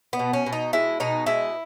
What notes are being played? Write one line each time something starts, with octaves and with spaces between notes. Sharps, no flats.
B3
B2
C#4
B2
D#4
G#3 E4
B2 D#4
G#3 E4